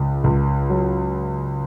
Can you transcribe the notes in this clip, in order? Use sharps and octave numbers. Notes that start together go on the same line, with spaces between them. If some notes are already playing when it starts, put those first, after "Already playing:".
Already playing: C#2
C#2
F#3